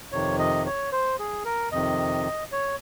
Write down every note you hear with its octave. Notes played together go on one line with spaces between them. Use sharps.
F2 C3 D#3 C#5
D#5
C#5
C5
G#4
A#4
F2 C3 D#3 D#5
C#5